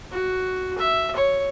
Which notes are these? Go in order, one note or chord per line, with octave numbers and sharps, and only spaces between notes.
F#4
E5
C#5